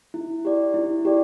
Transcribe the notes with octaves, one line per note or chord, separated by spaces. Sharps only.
E4
G4 D5
E4
G4 D5